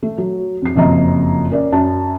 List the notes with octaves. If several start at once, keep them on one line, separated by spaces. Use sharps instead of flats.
A3
F#3
F2 C7
F#1 F2 F3 D#5 A#5
C#4 A#4 D5
F#2 A5